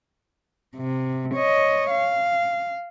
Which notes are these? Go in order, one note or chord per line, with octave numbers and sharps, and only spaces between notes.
C3
C#5 D#5
F5